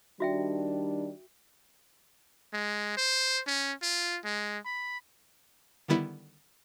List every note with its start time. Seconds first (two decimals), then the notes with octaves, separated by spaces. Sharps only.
0.20 D#3 G3 D4 F#4 E5 G5
2.53 G#3
2.97 C5
3.47 C#4
3.82 F4
4.24 G#3
4.65 B5
5.88 D3 D#3 G3 B3 E4